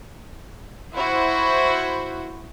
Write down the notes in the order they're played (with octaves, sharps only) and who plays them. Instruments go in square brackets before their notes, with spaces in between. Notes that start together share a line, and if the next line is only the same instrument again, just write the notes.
[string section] E4 F#4 C5